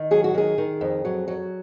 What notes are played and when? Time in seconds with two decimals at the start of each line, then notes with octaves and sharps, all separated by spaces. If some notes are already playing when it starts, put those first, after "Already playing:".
Already playing: D#3
0.11 F#3 G#4
0.24 F#4
0.34 D#3 G#4
0.58 D#3
0.81 F2
1.05 F#3
1.28 F#3